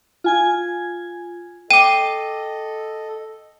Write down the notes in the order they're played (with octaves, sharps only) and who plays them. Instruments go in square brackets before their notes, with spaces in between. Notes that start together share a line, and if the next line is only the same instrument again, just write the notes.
[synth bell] F4 G#5 G#6
[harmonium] A4 D#5 [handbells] G5 D6 [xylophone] D#7